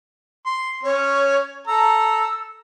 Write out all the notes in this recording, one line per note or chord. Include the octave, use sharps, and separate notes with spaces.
C6
C#4 C#5
A4 A#5 E6